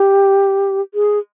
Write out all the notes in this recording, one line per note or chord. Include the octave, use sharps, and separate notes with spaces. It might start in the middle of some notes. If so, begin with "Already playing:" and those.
Already playing: G4
G#4